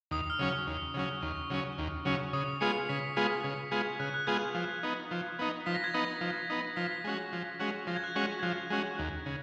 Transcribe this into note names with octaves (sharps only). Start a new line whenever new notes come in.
D#2 D#6
D#6
F6
C#3 F#3 C#4
F6
D#2
C#3 F#3 C#4
D#2 C#6
C#3 F#3 C#4
D#2
C#3 F#3 C#4
C#3 D#6
G#3 B3 F4 G#4 C#7
C#3 B6
G#3 B3 F4 G#4 B6
C#3
G#3 B3 F4 G#4 G#6
C#3 F#6
F#6
G#3 B3 F4 G#4 G#6
F3
B3 D#4
F3
B3 D#4
F3 B6
A#6
G#6
B3 D#4 A#6
F3
B3 D#4
F3 B6
G#3 C#4 F#4
F3
G#3 C#4 F#4
F3 A#6
G#6
F#6
G#3 C#4 F#4 G#6
G#6
F3 F#6
G#3 C#4 F#4
D#2
C#3